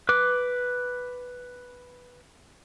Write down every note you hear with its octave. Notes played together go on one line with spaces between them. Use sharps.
B4 D6